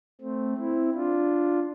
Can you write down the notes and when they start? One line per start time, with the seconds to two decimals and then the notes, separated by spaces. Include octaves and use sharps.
0.21 A3 C4
0.58 C4 E4
0.94 D4 F4